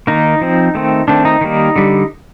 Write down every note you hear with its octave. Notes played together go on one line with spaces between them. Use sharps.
D#3 A#3 D#4
F3 C4
D#3 A3 C4
D#3 A3 C4 D4
D#4
D#3 G3 A#3
D3 G3